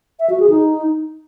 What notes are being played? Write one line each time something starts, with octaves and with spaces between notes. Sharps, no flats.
E5
F#4
G#4
D#4